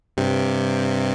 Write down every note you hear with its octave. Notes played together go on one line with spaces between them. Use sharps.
G2 C3